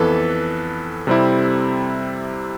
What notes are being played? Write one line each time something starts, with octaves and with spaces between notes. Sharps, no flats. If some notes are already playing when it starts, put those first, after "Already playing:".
Already playing: F2 E3 B3 A4 B4
C3 G3 C4 E4